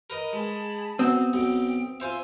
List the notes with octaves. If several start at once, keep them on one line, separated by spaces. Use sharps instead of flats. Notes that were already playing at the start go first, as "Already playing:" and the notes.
A#4 B4 D#5
G#3 G#4 A5 B5
B2 B3 C4 D#6
B1 B2 G5
F4 C5 E5 G#5